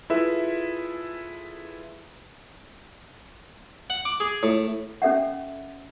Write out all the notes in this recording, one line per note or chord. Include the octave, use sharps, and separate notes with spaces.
E4 F4 G#4 A4 B4 E5
F#5
D6
G#4
A2
C#4 A4 E5 F#5